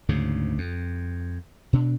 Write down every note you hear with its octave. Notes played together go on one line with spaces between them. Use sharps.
D2 G#2 C#3
F2
B2 D4